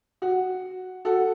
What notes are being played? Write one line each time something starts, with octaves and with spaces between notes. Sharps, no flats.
F#4
F#4 A4